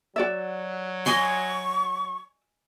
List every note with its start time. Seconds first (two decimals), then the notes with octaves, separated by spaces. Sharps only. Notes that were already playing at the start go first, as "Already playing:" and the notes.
0.16 F#3 F#4 D5 E5
1.06 D#5 G#5 C6 C#6